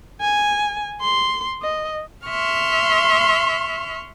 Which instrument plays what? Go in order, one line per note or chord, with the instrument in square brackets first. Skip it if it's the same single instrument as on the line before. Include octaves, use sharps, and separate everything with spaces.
[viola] G#5
C6
D#5
[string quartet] E5 C6 C#6 F6